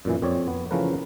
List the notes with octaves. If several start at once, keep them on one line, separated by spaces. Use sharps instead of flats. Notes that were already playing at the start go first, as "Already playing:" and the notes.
F#2 A#2 E3
F2 C4 C#5 D5
B3
C#3 E3 F3 A3 A#4 B4